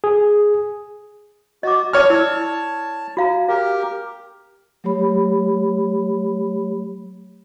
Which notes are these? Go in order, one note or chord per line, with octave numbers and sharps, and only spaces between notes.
G#4
F#4 D#5 D6
C#5 A5 F6
E4 D5 E6
F#4 F5 A#5
G4 A#4 F5
F#3 A3 G4 C#5 B5